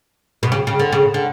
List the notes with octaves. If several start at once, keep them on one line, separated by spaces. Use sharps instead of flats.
B2
C#3
C#3
D3
C#3
D3